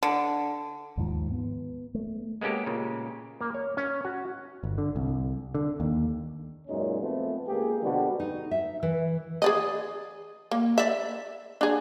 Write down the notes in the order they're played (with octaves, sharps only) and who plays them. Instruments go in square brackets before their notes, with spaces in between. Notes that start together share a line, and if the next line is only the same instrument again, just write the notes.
[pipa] D3
[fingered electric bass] D#2 G#2 D#3 F3
B3
A3
[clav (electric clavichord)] G#3 A#3 B3 C#4 G4 A4
A#2 C#3
A#3
C#5
C#4
F#4
[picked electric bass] G1
D3
C2
D3
D#2
[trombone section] C#2 F#2 A#2 G#3 C#4 D#4
F3 A3 B3 C4
C#2 A#3 G4 G#4
B2 D3 F3 G3 F#4 A4
[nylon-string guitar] D#4
E5
E3
[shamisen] G#4 D5 D#5
A#3
D5 E5
D4 G#4